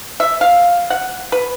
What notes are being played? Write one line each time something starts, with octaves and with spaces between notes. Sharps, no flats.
E5
F5
F#5
B4